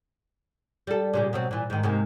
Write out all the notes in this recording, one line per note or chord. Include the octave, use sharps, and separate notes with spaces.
G3 A4
A#2 C#3 G3
B2 F#3 C4
A#2 E3
G#2 D#3
G#2 C3 A#3